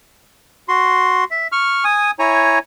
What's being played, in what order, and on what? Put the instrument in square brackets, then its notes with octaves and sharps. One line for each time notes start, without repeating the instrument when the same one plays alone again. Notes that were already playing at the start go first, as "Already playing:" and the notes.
[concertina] F#4 C6
E5
C#6 F6
G#5 D#6
E4 C#5 G#5 A#5